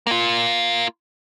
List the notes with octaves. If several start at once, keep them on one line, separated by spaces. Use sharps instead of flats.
A#3 F4